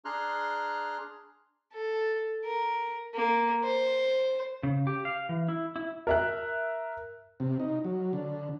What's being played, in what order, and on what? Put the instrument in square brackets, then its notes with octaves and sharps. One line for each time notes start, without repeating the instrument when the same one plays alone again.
[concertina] D4 G#4 A#5 C6 F6 F#6
[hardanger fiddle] A4
A#4
A#3
C5
[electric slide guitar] C#3
G4
F5
E3
E4
E4
[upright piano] A#4 E5 F#6
[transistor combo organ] C3
D#4
F#3
D3